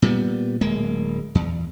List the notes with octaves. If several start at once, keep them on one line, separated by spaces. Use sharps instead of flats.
A#2 G3 B3
D1 G#3 A#3
E2